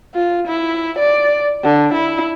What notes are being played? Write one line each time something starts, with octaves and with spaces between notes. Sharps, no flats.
F4
E4
D5
D3
E4